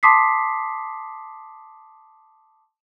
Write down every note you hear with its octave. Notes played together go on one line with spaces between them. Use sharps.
A5 C6 D6 D#6 B6 C7